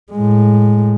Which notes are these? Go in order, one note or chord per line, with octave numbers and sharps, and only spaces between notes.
A2 G#3